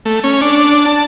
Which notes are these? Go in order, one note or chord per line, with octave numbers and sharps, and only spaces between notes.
A3
C#4
D4
A5